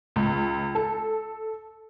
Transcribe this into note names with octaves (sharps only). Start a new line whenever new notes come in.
C#2
A4